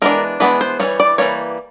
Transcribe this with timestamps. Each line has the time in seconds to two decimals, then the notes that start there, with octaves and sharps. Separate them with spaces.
0.02 E3 G#3 B3 D4 A#4
0.40 E3 G#3 B3 D4 B4
0.61 C5
0.80 E3 G3 A#3 C#5
1.00 D5
1.18 E3 G3 A#3 C#5